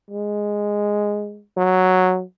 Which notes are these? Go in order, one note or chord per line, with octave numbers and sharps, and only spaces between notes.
G#3
F#3